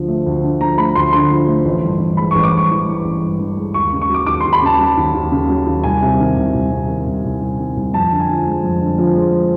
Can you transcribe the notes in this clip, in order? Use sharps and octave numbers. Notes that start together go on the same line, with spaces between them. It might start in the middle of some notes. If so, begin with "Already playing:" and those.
Already playing: D2 D3 F3
A3
D2
D3
F3 A#5
A3 B5
D2 C6
D3 C6
F3
A3
A1
G2
E3
G#3 B5
A1 C#6
D6
G2 C#6
E3
G#3
A1
G2
E3
G#3
D#2 C#6
C#3
C#6
F#3 D6
D#2 D6
D#2 C6
B5
C#3 A5
F#3
D#2
D#2
C#3
F#3
D#2
C2 G#5
C3
D#3
C2
C2
C3
D#3
C2
C2
C3
D#3
C2
F2 A5
D3
G#5
F3
G#3
F2
D3
F3
G#3